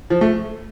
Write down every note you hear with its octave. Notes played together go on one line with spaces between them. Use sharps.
F3
A3